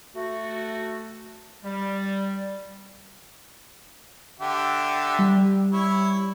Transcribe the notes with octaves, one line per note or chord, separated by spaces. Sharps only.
A3 F#4
G3
D3 G4 E5
G3
E4 C#5